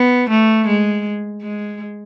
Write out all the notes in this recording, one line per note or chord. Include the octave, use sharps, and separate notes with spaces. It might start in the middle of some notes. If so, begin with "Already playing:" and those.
Already playing: B3
A3
G#3
G#3